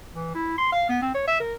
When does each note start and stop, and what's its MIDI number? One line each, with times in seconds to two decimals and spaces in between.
0.13 0.31 52
0.34 0.56 64
0.58 0.71 84
0.72 0.86 77
0.89 1.00 59
1.02 1.12 60
1.14 1.27 73
1.27 1.38 76
1.40 1.54 70